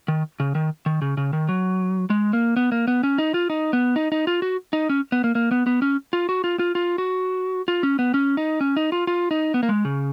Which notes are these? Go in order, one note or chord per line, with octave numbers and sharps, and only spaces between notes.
D#3
C#3
D#3
D#3
C#3
C#3
D#3
F#3
G#3
A#3
B3
A#3
B3
C#4
D#4
F4
D#4
B3
D#4
D#4
F4
F#4
D#4
C#4
B3
A#3
A#3
B3
B3
C#4
F4
F#4
F4
F4
F4
F#4
F4
C#4
B3
C#4
D#4
C#4
D#4
F4
F4
D#4
B3
A#3
G#3
C#3